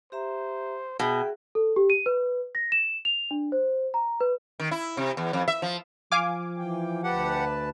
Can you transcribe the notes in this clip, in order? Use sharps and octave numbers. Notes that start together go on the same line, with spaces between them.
G4 C5 E5 A#5
B2 G#4 E5 G5
A4
G4
D#7
B4
A#6
E7
F7
D4
C5
A#5
B4
D#3
E4
C3
E2
F2
E5
F3
F3 F5 G#5 D6
E3 G5
D2 G4 B4 F#5 A5